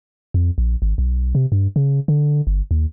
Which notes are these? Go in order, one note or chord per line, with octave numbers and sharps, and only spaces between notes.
F2
A#1
G#1
B1
C3
G2
C#3
D3
G1
D#2